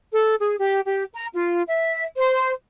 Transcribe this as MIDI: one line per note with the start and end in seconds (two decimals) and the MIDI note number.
0.13 0.36 69
0.39 0.56 68
0.58 0.80 67
0.86 1.04 67
1.14 1.27 82
1.35 1.63 65
1.67 2.06 76
2.16 2.52 72